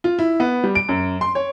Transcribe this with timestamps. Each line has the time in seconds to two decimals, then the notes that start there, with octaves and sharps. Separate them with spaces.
0.04 F4
0.19 E4
0.40 B3
0.64 G3
0.75 D7
0.89 F#2
1.21 C6
1.35 C#5